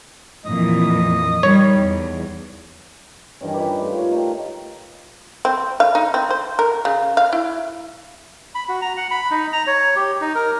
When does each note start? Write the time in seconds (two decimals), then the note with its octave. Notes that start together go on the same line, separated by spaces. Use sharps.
0.45 F2 A#2 E3 D#5
1.43 D#3 G3 C#5
1.78 E2
3.41 G2 D#3 E3 C#4
3.54 G4 B4 D#5 D6
3.69 D6
3.81 A3 F4
3.98 C#5
4.11 A3 D#4 A#4 G5
5.45 C4
5.80 F5
5.95 D#4
6.14 C4
6.30 C5
6.59 A#4
6.85 C#3
7.17 F5
7.33 E4
8.55 B5
8.69 F#4
8.82 A#5
8.97 F#5
9.11 B5
9.31 D#4
9.53 A#5
9.67 C#5
9.96 G4
10.21 D#4
10.35 A#4